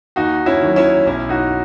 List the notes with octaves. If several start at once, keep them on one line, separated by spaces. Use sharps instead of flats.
D#2 D#4 F#4
C#4 E4
D#3 F#3
C#4 E4
B1 C#4 E4
D#4 F#4